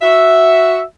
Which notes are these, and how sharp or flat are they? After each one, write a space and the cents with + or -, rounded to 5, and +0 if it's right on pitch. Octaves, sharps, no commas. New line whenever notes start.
F#4 +0 E5 +0